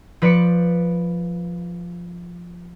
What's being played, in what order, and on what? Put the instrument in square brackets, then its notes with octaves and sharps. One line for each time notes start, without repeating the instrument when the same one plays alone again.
[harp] F3 B4 D5 B5 C#7